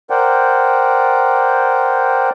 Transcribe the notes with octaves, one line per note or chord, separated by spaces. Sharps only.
A#4 C5 D5 F#5 G5